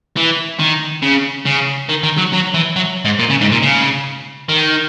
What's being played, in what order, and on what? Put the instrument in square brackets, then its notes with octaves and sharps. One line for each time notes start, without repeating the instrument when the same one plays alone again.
[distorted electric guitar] E3
D#3
C#3
C#3
D#3
D#3
F#3
F#3
E3
F#3
G#2
A#2
C#3
G#2
A#2
C#3
D#3